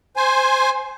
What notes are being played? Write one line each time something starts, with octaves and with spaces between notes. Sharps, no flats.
C5 G#5